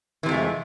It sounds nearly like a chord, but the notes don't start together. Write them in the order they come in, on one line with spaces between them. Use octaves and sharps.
E3 C3 F2 A3 G#3